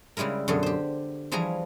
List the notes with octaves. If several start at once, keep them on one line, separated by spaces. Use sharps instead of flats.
C#3 G3 G#3 E4 A#4
F#2 B2 D3 G#4
G4 C5
E3 F3 G3 G#4 G#5 A#5